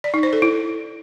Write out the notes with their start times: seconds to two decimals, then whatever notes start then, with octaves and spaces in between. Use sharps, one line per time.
0.04 D5
0.14 D#4
0.23 C5
0.33 A4
0.42 E4